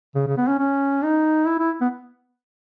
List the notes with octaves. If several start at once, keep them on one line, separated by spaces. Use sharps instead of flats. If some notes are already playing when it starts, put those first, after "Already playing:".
C#3
C#3
B3
C#4
C#4
D#4
E4
E4
B3